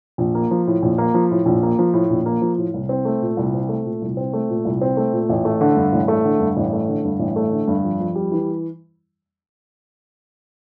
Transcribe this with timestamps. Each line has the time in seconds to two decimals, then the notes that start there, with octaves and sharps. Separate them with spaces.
0.18 A#1
0.35 A#3
0.51 F3
0.67 A2
0.82 A#1
0.98 A#3
1.14 F3
1.31 A2
1.46 A#1
1.63 A#3
1.79 F3
1.94 A2
2.10 A#1
2.26 A#3
2.42 F3
2.58 A2
2.74 C2
2.89 C4
3.05 A3
3.22 A#2
3.37 C2
3.54 C4
3.69 A3
3.85 A#2
4.02 C2
4.17 C4
4.33 A3
4.49 A#2
4.65 C2
4.81 C4
4.97 A3
5.13 A#2
5.29 A1
5.45 A3
5.61 D3
5.76 G2
5.93 A1
6.08 A3
6.24 D3
6.40 G2
6.57 A1
6.73 A3
6.88 D3
7.04 G2
7.19 A1
7.36 A3
7.52 D3
7.68 G2
7.84 F2
8.00 F2
8.15 G3
8.32 E3